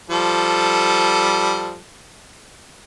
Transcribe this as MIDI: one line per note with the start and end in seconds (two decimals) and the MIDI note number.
0.10 1.79 53
0.10 1.79 55
0.10 1.79 69